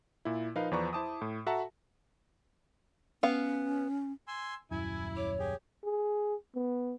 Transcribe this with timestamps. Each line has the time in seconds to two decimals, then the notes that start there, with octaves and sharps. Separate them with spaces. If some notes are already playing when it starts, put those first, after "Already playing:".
0.25 A#2 E4
0.55 F3 D#4 A#4 B4 F5
0.71 E2 F3 B4 D5 A#5 C#6
0.93 E4 C5 A5 D6 D#6
1.22 A2
1.46 F#4 A4 E5 F#5 A5 A#5
3.23 B3 C#4 F5
4.28 G#5 C6 E6
4.71 D#1 F#2 E4 G#5
5.17 C#5 D6
5.39 G4 G#4
5.84 G#4
6.55 B3